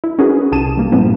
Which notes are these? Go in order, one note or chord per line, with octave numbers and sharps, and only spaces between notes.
E4
C#4 D#4 F#4 G#4 A#4 B4
C2 G4 G#4 A5 D#7 E7
G3 A#3
G2 A#2 F3 B3 C4 E4